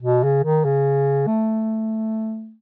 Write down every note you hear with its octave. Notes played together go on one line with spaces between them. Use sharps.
B2
C#3
D#3
C#3
A3